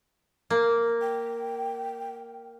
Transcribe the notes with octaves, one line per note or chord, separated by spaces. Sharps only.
A#3
G5